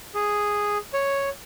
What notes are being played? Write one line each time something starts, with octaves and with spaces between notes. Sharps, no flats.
G#4
C#5